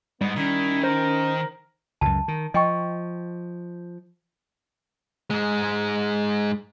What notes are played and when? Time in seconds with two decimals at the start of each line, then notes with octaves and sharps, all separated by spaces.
0.21 G#2 G3 B3
0.37 D#3 C#4 E4
0.83 A#4 C5
2.01 C#2 F#2 A5
2.28 D#3
2.54 F3 D#5 G5 C#6
5.30 G#2 G#3